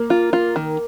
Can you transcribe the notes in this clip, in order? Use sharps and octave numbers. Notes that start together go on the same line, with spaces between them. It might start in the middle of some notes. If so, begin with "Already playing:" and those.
Already playing: A#3
F4
F4
D#3